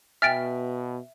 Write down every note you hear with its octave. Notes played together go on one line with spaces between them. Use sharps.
B2 E5 G5 G#5 F6 A6 D7